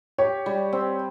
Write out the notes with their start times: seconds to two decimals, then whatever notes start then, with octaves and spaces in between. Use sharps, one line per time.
0.18 G4 C#5
0.46 G3
0.73 C4